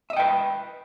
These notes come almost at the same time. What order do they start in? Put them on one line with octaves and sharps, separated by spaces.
E5 D#5 G5 B4